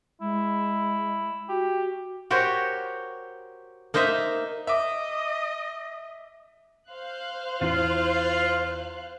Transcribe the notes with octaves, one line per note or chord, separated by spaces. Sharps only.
G#3 E4
F#4 G4
F#4 G4 A#4 C5 C#5
A#3 D#4 C5 D#5 E5
D#5 E5 D6
C5 F5 F#6
E2 E3 F4 F#7